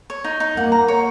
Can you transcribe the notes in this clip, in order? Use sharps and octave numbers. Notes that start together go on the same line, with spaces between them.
C#5
D#4
D#4
A#3 F#5
A#5
C#5